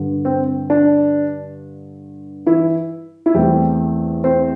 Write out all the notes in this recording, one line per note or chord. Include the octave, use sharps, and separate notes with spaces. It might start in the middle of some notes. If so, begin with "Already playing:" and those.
Already playing: G2 D3
C4
D4
E3 E4
E4
E2 E3 G3 A3 C4 G4
C4 C5